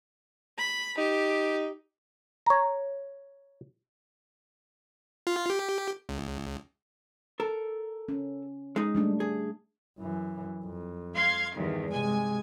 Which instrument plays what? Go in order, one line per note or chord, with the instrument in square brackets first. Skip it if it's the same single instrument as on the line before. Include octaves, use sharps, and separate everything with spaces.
[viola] B5
[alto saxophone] D#4 [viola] G4
[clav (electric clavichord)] C#5 A#5
[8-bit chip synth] F4
G4
C#2
[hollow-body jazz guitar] A4 A#4
[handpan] C#4
[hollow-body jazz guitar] G#3 D#4
[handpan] G3 A3 D4
[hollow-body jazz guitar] G#4
[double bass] F#2 E3
F2
[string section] F5 C6 G#6
[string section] E2 G2 [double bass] D#3
[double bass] C3 G#3 [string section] G#5